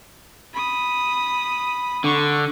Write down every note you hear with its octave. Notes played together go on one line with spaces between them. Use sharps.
B5 D#6
D3 C#6